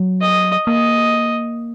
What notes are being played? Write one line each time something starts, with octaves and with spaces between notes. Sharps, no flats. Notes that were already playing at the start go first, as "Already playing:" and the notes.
Already playing: F#3
D#5
A#3 D#5